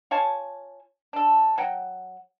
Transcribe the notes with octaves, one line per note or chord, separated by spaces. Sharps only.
F4 C#5 G#5 A5
D4 A4
F#3 F#5 G5